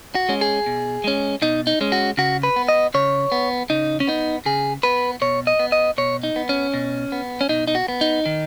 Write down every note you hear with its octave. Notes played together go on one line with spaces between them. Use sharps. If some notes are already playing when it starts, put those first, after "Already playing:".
F#4
G#3 C#4
G#4
B2
G#3 C#4
B2 D#4
D#4
G#3 C#4
F#4
C#3 F#4
B4
B3
D#5
C#3 C#5
B3
C#3 D#4
C#4
B3 D#4
C#3 G#4
B3 B4
B2 C#5
D#5
B3
D#5
B2 C#5
D#4
B3
C#4
B2
B3
C#4
B2 D#4
D#4
F#4
B3
D#4
D#3